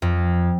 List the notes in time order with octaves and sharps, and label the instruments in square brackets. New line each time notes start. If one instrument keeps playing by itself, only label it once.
[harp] F2